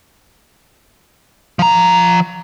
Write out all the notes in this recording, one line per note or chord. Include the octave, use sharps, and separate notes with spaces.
F3 A#5